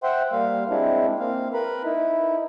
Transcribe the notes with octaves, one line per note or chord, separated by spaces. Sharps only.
C5 E5 F#5 G5 C6
G3 A#3 F5
G#3 C4 D4 E4
A#3 C4 F5
A#4 B4 B5
D#4 E4